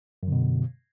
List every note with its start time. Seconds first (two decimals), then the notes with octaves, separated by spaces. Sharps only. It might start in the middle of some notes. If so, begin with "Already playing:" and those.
0.23 F#2
0.28 D3
0.32 B2